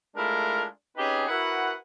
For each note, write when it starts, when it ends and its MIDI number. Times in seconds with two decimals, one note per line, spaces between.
0.15 0.64 56
0.15 0.64 57
0.15 0.64 62
0.15 0.64 64
0.15 0.64 65
0.15 0.64 70
0.95 1.25 60
0.95 1.25 61
0.95 1.25 63
0.95 1.25 67
0.95 1.25 68
0.95 1.25 71
1.27 1.71 64
1.27 1.71 66
1.27 1.71 70
1.27 1.71 71
1.27 1.71 78